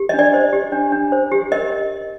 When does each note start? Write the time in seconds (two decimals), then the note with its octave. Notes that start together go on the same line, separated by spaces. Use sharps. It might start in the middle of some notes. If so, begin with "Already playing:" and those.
Already playing: G4
0.09 D4 D#5
0.19 D5
0.34 C5
0.53 G4
0.72 D4
0.92 D4
1.12 C5
1.32 G4
1.51 A#4 D#5